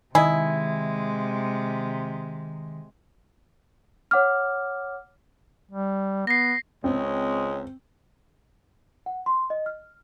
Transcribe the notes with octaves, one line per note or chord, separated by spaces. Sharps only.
C3 D#3 G#3 E4 D#5 G#5
C#5 F#5 D6 F6
G3
B3 A#6 C7
C#2 G#3 C4 C#5
F#5
C6
D#5
F6